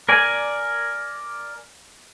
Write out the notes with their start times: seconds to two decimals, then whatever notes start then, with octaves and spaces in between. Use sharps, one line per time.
0.09 A#4 D5 G#5